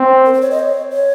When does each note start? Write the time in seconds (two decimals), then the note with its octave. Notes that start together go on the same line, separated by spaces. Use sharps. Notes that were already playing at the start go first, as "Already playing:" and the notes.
Already playing: C4
0.25 A#4
0.33 C5
0.41 C#5
0.51 D#5
0.59 C#5
0.91 C#5